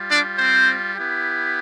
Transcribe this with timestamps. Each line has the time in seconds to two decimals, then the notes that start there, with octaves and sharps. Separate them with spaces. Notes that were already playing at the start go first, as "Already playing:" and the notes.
Already playing: G3 F4
0.08 D4 D5
0.37 C4 C5
0.96 B3 E4 G4